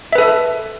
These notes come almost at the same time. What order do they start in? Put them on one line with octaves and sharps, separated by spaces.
E5 B4 A4